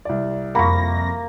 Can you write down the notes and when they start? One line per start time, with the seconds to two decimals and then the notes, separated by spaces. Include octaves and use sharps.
0.05 C2 D5
0.55 F2 A#3 B5 C#6 A#6